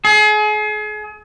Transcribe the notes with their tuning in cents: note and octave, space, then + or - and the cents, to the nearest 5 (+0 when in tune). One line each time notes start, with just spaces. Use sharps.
G#4 +35